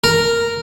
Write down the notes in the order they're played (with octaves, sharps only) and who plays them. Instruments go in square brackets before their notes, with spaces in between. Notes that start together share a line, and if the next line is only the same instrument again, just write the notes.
[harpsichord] A#4